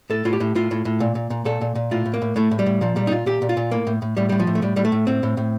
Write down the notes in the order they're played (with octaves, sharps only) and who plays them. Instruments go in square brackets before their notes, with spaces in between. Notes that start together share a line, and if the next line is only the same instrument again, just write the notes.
[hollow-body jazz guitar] A2 A4
A2 F4
G4
A2
A2 F4
A2
A2
A#2
A#2
A#2
A#2 A4
A#2
A#2
A2 F4
A2
A#3
A2
A2 A3
A2
G3
A2
A#2 F3
A#2 G3
D#4
A#2 F4
A#2 G4
A#2
F4
A#2
A2 A#3
A2
A2
A2 G3
A2 G3
F3
A2
A3
A2 G3
A2 G3
A3
A2
A2 C4
A2
A2